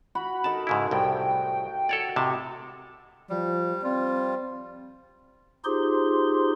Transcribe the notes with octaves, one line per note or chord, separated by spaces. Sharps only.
F#4 B5
D#4 A4 A#4 A5
G#2 C#3 E4
C2 A2 G5
F#4 A4 C#5 D5
A2 C3 D#5 A5
F3 G3
G3 C4 F4
D#4 F4 G4 G#4 C5 C6